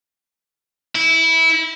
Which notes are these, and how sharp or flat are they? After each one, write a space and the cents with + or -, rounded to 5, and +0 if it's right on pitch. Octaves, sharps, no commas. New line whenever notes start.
E4 -15